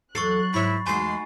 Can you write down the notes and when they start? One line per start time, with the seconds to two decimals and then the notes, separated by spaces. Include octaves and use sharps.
0.15 E2 F#3 A4 C#6 F#6 A6 C7
0.54 G#2 E4 C#5 B5
0.86 E2 G#3 A3 D#4 F#4 G#5 C6 C7